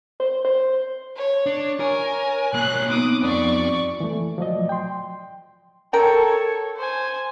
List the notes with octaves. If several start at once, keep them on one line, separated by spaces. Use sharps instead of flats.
C5
C5
C#5
D4
A#4 C#5 G#5 C#6
B1 A#3 F#6
B3 C4 D#4 D6 D#6
F2 D5 C#6
E3 A3
F3 F#3 D5 D#5
G5 C6
A4 A#4 C#5 G5
C5 G#5